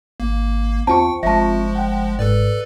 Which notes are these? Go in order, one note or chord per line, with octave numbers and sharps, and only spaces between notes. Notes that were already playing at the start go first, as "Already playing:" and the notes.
G#1 A#3
E2 C4 F4 G5 A5 C#6
G1 F3 G#3 E5 A5
F#5 G5
G#2 A4 B4 D5